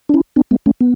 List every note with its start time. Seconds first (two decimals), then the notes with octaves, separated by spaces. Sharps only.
0.09 D4
0.14 C#4 E4
0.36 B3 D4
0.51 G#3 B3
0.66 A3 C#4
0.81 B3